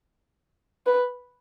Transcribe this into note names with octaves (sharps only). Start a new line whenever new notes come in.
B4